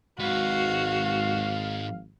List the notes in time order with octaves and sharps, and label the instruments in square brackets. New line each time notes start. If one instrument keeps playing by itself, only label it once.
[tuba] G#1 [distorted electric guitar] G#2 B4 [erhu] F#4 [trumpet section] F5